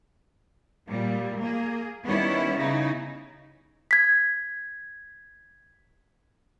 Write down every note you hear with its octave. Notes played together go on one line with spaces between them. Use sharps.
A#2 G3
A#3 G#4
D#3 G3 B3 C#4 E4 C#5
C#3 D#4 E4
G#6 B6